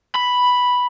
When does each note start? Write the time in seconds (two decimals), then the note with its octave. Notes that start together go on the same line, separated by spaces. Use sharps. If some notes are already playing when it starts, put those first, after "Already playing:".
0.16 B5